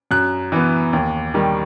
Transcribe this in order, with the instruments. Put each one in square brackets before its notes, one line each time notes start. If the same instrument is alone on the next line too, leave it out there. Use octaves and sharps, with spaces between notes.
[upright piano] F#2 F#6
E3 B3
D#2
D#3 G3